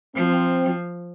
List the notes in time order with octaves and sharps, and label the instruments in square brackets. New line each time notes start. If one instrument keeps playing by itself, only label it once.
[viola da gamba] F3 [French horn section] C4